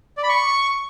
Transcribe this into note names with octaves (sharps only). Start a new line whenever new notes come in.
D5
B5
C#6